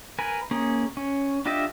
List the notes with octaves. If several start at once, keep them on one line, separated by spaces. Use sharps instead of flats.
A#4 B4 G#5
A#3 C#4 G#4
C#4
D4 F4 G4 D#5 E5